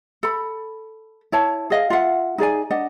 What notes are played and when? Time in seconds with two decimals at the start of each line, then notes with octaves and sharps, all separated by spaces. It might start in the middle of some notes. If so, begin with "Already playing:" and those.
0.23 A4 B5
1.32 E4 C#5 A5
1.70 G#4 D#5 F5
1.90 F4 E5 F#5
2.38 D#4 G#4 D5 G#5
2.71 D4 D#5 F#5